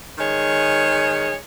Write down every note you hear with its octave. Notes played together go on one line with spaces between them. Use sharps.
D#3 G#3 G#4 C#5